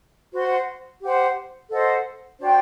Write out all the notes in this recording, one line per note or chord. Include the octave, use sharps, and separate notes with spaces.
F#4 C5 F#5 C6
G4 C5 F#5
A4 C5 D#5 F#5
D4 F#4 C5 G5